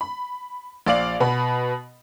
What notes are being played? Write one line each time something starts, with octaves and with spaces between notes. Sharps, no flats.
B5
A#1 D5 F5 F#7
B2 B3 B5